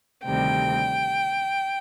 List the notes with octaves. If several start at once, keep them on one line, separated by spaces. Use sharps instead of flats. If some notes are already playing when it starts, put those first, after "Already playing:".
D2 C3 D#3 G3 C4 G5